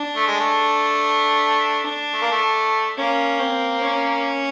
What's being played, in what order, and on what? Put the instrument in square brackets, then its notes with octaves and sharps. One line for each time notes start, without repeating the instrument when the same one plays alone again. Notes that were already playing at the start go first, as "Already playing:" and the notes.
Already playing: [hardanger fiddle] D4
[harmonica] A3
G#3
A3
A3
A#3
A3
[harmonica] A#3 [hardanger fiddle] C#4
[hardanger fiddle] C4
C#4